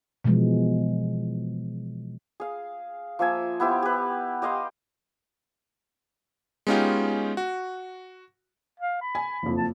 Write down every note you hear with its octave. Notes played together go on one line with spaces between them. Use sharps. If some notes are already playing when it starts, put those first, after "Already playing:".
B2 E3 F3 G#3
G#4 F5
F3 A#3 E5 G#5
B3 E4 G4 C5
G4 B4
G4 D#5 F5 C6
G#3 B3 C#4 D#4 F4 G4
F#4
F5
B5
G#5
F#1 F2
A5